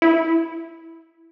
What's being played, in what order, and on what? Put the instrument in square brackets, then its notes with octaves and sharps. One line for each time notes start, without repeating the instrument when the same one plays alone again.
[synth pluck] E4